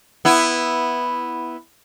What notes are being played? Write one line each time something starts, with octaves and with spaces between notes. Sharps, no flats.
B3 E4